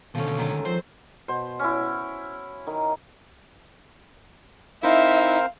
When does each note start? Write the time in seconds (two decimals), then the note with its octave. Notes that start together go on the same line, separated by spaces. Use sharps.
0.15 D#2 B2 D3 F3 C#4 A4
0.37 D#3 F#3 G#3
0.65 F3 C4 C5
1.28 B2 C5
1.59 C#4 E4
1.81 C5
2.67 D#3
4.83 C4 D#4 E4 A#4 C5 E5 F5